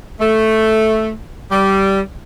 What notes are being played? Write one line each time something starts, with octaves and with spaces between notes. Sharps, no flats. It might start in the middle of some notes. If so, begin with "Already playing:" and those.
A3
G3